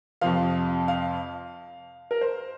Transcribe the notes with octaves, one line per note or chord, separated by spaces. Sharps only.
F2 C3 F3 F5
F5
A#4
C5